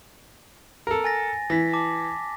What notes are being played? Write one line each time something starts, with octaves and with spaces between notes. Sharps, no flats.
A4 A#4
G#5 A6 A#6
E3 A#6 B6
A5 D6